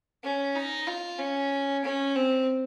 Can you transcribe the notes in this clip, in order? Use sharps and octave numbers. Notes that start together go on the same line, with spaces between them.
C#4
D#4
F4
C#4
C#4
C4